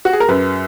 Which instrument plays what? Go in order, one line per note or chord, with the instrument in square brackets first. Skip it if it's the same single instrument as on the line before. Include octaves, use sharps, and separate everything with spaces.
[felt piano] F#4
G#4
A#4
F#2 B4